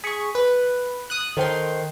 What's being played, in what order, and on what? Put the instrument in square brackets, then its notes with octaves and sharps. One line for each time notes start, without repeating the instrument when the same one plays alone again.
[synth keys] G#4 C#6 [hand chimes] B6 C#7
[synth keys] B4
D#6 F#6
[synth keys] D#3 C6 [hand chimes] A4 C5 G5